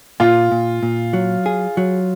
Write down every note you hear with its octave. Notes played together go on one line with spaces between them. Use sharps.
A#2 F4
A#2
A#2
F#3
G#4
F#3